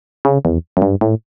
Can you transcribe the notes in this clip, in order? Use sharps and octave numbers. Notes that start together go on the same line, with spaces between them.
C#3
E2
F#2
G2
A2